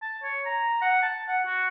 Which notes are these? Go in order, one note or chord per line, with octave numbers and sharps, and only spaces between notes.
A5
C#5
A#5
F#5
A5
F#5
F#4